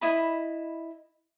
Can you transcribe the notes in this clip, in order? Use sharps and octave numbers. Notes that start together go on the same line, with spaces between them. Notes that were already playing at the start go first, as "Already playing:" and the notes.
E4 D#5 B5